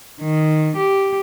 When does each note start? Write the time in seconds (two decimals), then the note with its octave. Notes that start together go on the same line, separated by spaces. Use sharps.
0.21 D#3
0.76 G4